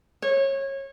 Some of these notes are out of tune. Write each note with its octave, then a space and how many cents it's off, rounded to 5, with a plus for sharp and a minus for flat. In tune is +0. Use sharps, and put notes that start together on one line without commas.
C#5 -25